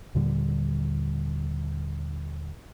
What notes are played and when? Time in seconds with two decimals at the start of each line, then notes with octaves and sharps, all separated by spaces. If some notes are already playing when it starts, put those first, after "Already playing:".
0.15 D#2 A#2 D3 G3